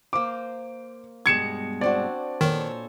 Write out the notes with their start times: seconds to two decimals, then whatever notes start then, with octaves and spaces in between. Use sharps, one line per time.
0.13 A#3 C5 D6
1.26 G2 B2 G#3 G#6 C#7 E7
1.81 C4 D4 F#4 D5
2.41 A#2 D#3 A4 C5 C#5